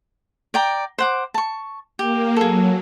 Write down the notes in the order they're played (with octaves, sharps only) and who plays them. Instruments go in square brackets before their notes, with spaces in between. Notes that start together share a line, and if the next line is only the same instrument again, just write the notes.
[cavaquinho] D5 G5 A#5
C5 F#5 D6
A5 C#6
[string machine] A#3 [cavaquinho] G4
[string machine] F#3 [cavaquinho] G#4 A4